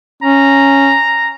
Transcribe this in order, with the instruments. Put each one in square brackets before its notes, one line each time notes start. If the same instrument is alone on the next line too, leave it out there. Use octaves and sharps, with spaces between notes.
[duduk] C#4 [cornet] A#5